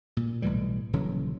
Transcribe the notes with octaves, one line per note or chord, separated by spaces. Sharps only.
A#2
B1 A2 E3 G3
D#1 C#3 E3 F#3